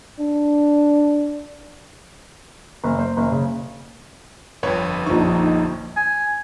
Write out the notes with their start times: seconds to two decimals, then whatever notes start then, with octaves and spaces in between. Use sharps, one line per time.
0.19 D4
2.84 F#1
2.99 C5
3.17 F#1
3.31 C#3
4.63 G1 F2 B4 C#5 B5
5.06 A#1 F3 D#4 C#6
5.96 G#5